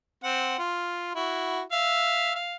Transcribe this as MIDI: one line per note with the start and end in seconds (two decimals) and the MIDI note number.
0.24 0.57 60
0.24 0.57 78
0.58 1.13 65
1.15 1.61 64
1.15 1.61 66
1.72 2.33 76
1.72 2.33 77
2.35 2.56 77